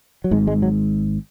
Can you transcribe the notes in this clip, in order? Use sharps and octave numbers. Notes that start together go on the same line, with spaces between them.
F#3
G#1 G#2 G#3
G#3
F#3